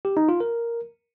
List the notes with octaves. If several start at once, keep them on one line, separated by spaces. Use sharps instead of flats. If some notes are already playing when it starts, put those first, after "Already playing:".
G4
D#4
F4
A#4